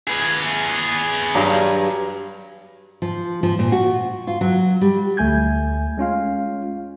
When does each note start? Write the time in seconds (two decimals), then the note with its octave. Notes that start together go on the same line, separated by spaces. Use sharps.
0.08 G#4 B4
1.35 G2 F#3 A#5
3.02 F3
3.43 F3
3.59 A#2
3.72 F#4
4.27 F4
4.41 F#3
4.81 G3
5.17 D2 A3 G#5 G6 G#6
5.98 G#3 C#4 F4 F5